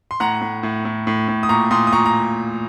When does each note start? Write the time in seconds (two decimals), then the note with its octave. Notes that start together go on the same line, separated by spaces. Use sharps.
0.11 C6
0.20 A2 F#5 A#5
0.41 A2
0.63 A2
0.85 A2
1.07 A2
1.28 A2
1.43 D#6
1.49 A#2 A#5 C#6
1.71 A#2 C6 D#6
1.87 D#6
1.92 A#2 A#5 C#6
2.06 A#5